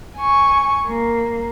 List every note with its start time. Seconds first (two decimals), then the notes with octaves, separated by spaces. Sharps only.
0.18 G#5 C#6
0.88 A#3